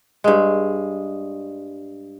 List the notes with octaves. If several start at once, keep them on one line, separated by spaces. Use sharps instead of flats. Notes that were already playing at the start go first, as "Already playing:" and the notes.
G2 G#3